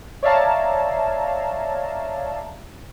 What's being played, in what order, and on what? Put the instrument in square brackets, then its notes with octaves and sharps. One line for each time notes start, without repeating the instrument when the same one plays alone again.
[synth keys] C#5 D5 E5 F5 A5 A#5